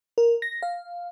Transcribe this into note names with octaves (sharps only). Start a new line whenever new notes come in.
A#4
A#6
F5